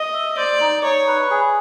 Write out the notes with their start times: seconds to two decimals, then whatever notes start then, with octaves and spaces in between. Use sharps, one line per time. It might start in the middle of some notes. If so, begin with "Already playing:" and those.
Already playing: D#5
0.13 E5
0.37 C5 D5
0.61 D#4
0.84 D#4 C#5
1.07 B4
1.31 G#4